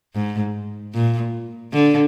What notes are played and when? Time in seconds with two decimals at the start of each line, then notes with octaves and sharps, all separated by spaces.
0.15 G#2
0.94 A#2
1.73 D3